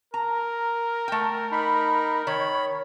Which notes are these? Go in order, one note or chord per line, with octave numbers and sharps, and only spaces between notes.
A#4 A#5
A3 G5
D#4 B5
D#3 C#5 B5